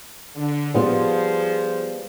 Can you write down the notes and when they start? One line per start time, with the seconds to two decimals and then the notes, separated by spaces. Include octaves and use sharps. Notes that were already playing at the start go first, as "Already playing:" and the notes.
0.36 D3
0.74 F3 G3 B3 F4 G#4 C5